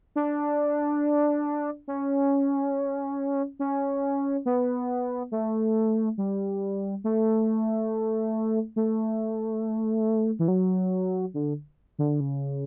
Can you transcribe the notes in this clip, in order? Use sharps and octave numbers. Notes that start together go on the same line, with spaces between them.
D4
C#4
C#4
B3
A3
G3
A3
A3
E3
F#3
D3
D3
C#3